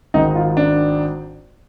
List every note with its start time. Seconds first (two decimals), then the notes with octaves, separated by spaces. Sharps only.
0.14 G#1 G#2 D#3 D#4
0.36 F4
0.57 D4